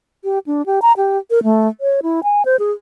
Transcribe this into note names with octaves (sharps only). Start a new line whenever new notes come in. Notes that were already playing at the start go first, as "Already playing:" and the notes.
G4
D4
G4
A#5
G4
A#4
A3
C#5
E4
G#5
C5
G#4